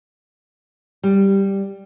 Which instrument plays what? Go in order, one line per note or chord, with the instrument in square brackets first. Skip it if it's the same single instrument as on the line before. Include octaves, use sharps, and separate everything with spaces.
[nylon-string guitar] G3